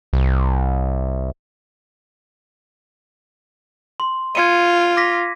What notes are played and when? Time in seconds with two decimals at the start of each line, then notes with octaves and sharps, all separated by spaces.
0.13 C2
4.00 C6
4.35 F4 G#6 C#7 D#7
4.97 D6 A#6 B6